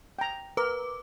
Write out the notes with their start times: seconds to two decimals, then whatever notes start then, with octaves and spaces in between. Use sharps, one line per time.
0.19 G5 A#5
0.57 A#4 B4 D6